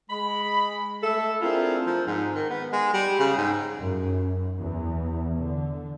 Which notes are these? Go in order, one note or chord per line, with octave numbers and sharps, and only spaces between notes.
G#3 B5
A3 A4 E5
C4 D4 E4 F4 G#4 A#4
F3
G#2
D#3
B3
G#3
G3
C#3
G#2
F#2
E2
D3